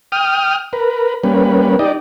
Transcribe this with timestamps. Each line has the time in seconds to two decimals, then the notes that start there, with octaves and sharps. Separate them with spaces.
0.12 G5 D#6 F6
0.73 A#4 B4
1.24 G3 A#3 C#4 B4
1.79 D#4 G4 D5 D#5